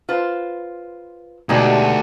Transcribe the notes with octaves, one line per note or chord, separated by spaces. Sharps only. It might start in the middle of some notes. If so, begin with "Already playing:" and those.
F4 B4 C5
D2 B2 G3 G#3 D4 D#4 G4